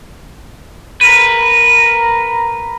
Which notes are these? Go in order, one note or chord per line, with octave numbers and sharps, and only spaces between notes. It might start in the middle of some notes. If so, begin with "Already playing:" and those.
A#4 B4